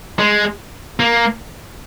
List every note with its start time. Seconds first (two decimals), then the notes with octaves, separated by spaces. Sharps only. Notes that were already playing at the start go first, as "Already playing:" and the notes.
0.19 G#3
1.00 A#3